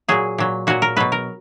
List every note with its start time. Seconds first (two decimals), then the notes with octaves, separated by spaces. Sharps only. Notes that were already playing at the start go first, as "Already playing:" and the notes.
0.08 A#2 F#3 G#4
0.38 A#2 F#3
0.67 A#2 F#3 F#4
0.82 A#4
0.97 B2 F#3 B4
1.12 A#4